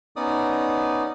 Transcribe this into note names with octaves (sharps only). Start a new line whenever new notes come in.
B3 C#4 D#4 D5 D#6